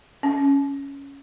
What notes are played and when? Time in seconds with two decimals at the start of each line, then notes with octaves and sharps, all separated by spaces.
0.23 C#4